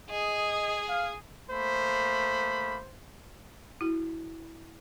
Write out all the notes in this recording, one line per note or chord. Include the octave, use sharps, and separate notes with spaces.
G#4 D#5
F5
A3 A#3 C5 B5
E4 F#4